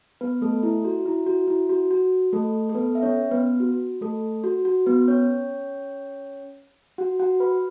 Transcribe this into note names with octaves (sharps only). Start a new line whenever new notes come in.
B3 B4
A3 A4
E4
F#4
E4
F#4
E4
F#4
F#4
A3 A4
A4
B3 B4
E5
C#4 C#5
B3 B4
F#4
A3 A4
F#4
F#4
B3 B4
C#4 C#5
F#4 F#5
F#4 F#5
B4 B5